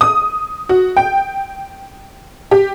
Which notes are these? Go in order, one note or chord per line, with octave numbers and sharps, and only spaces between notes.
D#6
F#4
G5
G4